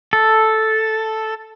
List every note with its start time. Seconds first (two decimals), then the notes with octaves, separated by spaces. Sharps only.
0.13 A4